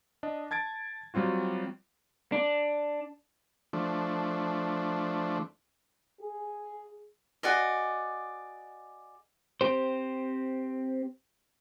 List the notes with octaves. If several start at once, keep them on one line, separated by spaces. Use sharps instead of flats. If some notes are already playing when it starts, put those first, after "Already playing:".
D4 D#5
A5 G#6 A6 D7
F#3 G3 C4 F4 F#4
D4
F3 A3 D4
G#4
F#4 G#4 D5 D#5
C4 G4 C5